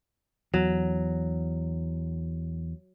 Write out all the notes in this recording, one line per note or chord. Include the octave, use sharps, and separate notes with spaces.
E2 F#3